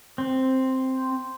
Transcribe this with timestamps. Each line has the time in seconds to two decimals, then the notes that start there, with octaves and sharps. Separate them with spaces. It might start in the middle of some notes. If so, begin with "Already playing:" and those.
0.18 C4